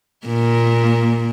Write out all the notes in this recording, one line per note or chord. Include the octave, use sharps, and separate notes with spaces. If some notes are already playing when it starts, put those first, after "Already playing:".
A#2 A#3